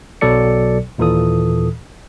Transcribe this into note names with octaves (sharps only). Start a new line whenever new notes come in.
B1 B2 F#3 A4 D5 C#7
D#2 A#2 E3 A4 D#6